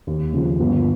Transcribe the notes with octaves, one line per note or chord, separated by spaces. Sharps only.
D#2
C#3 F3
G1